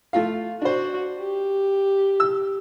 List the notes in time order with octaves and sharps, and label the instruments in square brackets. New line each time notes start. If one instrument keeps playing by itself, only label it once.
[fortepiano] A3 F4 F5
[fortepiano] D4 C5 [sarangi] F#4
[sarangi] G4
[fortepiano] E6